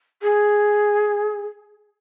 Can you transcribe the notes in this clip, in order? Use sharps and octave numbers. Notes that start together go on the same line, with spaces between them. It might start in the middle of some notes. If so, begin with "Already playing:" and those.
G#4